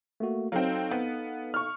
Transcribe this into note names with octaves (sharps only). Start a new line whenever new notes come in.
A3 A#3 F#4
F#3 C4 D#4 A4 F5
B3
C#6 F6